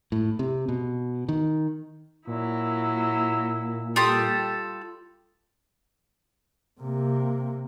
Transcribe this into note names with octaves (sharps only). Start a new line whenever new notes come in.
A2
C3
B2
D#3
A#2 F#3 E4
G3 F4 G4 A4 D#6
C3 A#3